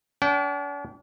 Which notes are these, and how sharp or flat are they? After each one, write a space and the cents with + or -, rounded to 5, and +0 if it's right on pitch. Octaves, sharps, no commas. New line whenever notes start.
D4 -45 G5 -30